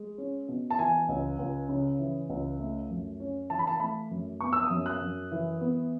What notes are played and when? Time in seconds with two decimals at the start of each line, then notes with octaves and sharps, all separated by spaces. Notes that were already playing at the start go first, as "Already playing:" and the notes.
Already playing: G#3
0.18 C#4
0.48 B2
0.70 A5
0.79 E3 G#5
1.09 C#2
1.39 C#2
1.69 C#3
1.99 E3
2.30 C#2
2.59 A3
2.90 F#2
3.20 C#4
3.50 E3 A5
3.59 B5
3.67 A5
3.80 A3 B5
4.11 F#2
4.41 B3 C#6
4.53 E6
4.63 D#6
4.70 F#2
4.86 F#6
5.02 F#2
5.31 E3
5.61 B3